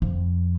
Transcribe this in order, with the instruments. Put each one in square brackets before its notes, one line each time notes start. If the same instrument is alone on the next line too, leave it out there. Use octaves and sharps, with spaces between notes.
[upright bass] F2